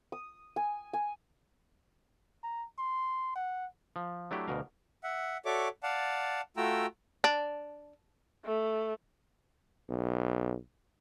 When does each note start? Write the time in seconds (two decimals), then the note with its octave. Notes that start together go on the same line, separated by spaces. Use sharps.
0.12 D#6
0.56 G#5
0.93 G#5
2.43 A#5
2.78 C6
3.35 F#5
3.96 F3
4.31 F#3 A3 D4 E4 G4
4.48 D2 B2 A#4 F5
5.03 E5 F#5
5.45 F#4 A4 C#5 D5 E5 D6
5.83 D5 F5 F#5 A5
6.57 A3 F4 F#4 G5 A#5 E6
7.24 D4
8.45 A3
9.89 B1